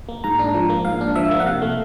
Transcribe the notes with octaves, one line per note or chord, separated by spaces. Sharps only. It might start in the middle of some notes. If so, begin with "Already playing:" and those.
A#3
G#2 A#5
D4
F3
A#3
G#2 F5
D4
F3 E5
A#3
F#5
C3 F5
A3